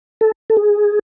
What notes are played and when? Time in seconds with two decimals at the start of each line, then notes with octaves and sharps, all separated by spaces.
0.21 A4
0.50 A4
0.57 G#4